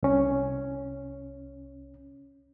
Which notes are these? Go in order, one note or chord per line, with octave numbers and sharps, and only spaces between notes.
C2 C#4